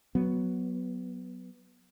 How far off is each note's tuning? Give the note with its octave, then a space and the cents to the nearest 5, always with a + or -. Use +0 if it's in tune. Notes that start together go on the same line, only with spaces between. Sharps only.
F#3 +0 B3 +0